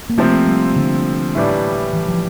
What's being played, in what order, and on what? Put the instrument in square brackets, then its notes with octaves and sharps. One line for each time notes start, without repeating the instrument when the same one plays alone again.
[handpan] A#3
[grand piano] C3 F3 C4 [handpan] A3
[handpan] G3
D3
[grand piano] A2 E3 G3 D4
[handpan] E3
F3